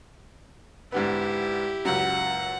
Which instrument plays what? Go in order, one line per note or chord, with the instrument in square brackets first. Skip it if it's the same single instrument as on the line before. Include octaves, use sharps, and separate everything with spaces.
[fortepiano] G#2 D3 B3 [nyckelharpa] E4 G4
[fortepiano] C#2 F#2 [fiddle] F#5